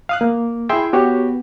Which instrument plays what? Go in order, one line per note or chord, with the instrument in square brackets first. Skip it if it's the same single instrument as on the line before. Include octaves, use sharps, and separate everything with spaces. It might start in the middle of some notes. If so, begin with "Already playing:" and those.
[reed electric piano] F5 D#6 F#6
A#3
[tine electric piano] E4 C6 [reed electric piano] G#4 E5 G5
[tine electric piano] B3 [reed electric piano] F#4 G4 C#5